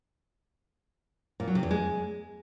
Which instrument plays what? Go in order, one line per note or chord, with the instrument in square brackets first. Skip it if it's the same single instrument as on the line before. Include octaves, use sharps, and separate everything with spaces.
[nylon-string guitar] A#2
F#3
C3
E2
G#3